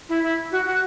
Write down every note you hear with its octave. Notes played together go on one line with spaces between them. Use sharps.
E4
E4
F#4
F#4